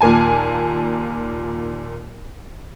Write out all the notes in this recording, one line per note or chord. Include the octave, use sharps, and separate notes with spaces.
D#2 A#2 A#3 G#5 A5